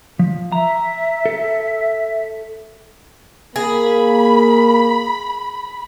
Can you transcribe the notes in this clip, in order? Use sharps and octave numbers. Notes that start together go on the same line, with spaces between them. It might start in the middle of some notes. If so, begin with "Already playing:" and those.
F3
E5 A#5
A4
A#3 G#4 B5